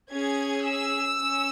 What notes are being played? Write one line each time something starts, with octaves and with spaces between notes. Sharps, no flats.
C#4 G#4 G#6
E6
C#4